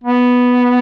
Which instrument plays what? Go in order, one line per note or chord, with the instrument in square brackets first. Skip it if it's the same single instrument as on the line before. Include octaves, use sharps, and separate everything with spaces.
[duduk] B3